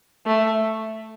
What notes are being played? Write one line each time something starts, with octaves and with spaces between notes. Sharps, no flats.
A3